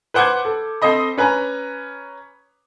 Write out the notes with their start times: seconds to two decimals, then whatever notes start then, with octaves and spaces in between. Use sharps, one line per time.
0.14 B4 C5 F#5 D6 G6 G#6
0.45 A4
0.82 C4 A4 C5 D#5 B5
1.17 C#4 B4 G#5 A#5